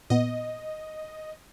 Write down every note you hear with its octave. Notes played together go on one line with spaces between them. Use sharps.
A#2 B3 D#5